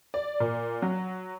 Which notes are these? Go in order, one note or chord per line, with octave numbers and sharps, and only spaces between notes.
D5
A#2
F#3